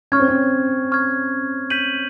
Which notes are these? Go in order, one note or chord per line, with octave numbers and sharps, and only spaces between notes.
C#4 C#6 F6 G#6
C4
C#4
C#6 F6 G#6
G6 B6 D#7 F#7